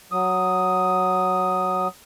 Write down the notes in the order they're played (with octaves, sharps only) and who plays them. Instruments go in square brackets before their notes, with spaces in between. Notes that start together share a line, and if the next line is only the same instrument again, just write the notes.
[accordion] F#3 D#6